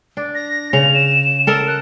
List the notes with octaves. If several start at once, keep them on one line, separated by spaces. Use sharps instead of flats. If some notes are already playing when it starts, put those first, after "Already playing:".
D4
A#6
C#3 F7
E7
A4 A#4 D#5
F#6